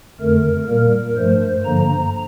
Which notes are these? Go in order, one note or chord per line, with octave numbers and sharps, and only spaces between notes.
F2 D3 A3 A#4
A#2 G3 A#3 A#4
G2 F3 A3 C5
G2 D3 F3 A#3 A#5